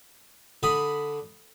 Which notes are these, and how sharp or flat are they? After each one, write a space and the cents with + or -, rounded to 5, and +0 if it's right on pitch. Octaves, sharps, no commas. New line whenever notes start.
D3 +0 B5 +0 D#6 +0